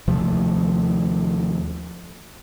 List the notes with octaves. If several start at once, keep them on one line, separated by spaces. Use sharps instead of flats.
D#2 C3 F3 A3